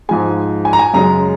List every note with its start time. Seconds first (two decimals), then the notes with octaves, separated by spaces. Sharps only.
0.09 G#2 F3 G#3 G#5
0.65 G#5
0.73 A#5
0.79 G#5
0.94 F#2 C#3 G#3 A#5